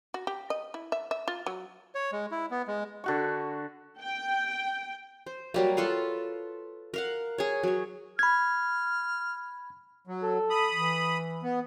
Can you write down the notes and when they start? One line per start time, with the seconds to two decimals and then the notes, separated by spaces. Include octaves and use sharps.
0.14 F#4
0.27 G4
0.50 D#5
0.74 E4
0.92 E5
1.11 E5
1.28 F4
1.46 F#3
1.95 C#5
2.12 G#3
2.31 E4
2.51 B3
2.68 G#3
3.04 D3 F#4 C#6
4.00 G5
5.26 C5
5.54 F#3 G3 A#3
5.77 F4 A4 B4 F5
6.94 A#4 F5 F#5
7.38 G#4 C#5
7.63 F#3 C#5
8.19 B5 F6 G#6
10.07 F#3
10.22 A4
10.50 B5 D#6
10.74 E3
11.43 B3